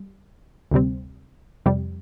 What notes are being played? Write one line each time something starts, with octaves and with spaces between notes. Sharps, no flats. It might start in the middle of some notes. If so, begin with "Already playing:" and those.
Already playing: G3
D2 C3 G3 C4
F2 C3 G3